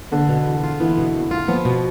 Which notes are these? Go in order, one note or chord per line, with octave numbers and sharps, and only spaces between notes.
D3 B3
B2
E2
F4
E3 B3
B2
E2
F4
F3 B3
B2